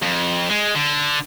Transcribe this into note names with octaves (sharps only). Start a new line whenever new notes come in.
F2
G#3
D3